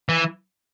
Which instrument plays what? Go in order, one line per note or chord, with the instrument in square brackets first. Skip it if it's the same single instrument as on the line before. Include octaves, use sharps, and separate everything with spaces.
[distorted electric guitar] E3